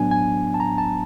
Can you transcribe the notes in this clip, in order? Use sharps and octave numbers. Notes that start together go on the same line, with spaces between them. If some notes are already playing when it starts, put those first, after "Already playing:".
Already playing: A2 F#3 B3 D4 G#5
G#5
A5
A#5
A5